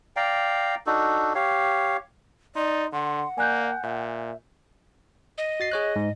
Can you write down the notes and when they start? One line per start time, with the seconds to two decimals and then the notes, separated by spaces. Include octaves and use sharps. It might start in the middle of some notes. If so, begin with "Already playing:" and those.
0.16 D5 F5 G5 A#5
0.87 D4 D#4 F#4 A4
1.35 G4 C#5 F5
2.56 D#4 D5 C6
2.93 D3 F#5 C6
3.38 A#3 D5 G#5 F#6 G6
3.83 A#2 E5
5.38 D#5
5.60 F#4 A6 C7
5.72 G#4 C#5 F#6
5.96 G#2